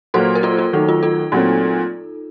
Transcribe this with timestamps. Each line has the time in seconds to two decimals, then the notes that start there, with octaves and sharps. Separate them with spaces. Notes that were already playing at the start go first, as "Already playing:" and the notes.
0.14 A#2 F#3 A#3 A4 C5
0.35 A#4
0.43 F4 A4
0.59 F4
0.73 D#3 F#3 A3 D#4
0.89 F4
1.03 F4 A4
1.32 A#2 F#3 A3 C4